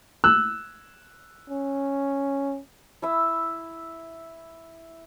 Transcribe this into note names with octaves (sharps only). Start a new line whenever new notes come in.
E6 F#6
C#4
E4 E5 E6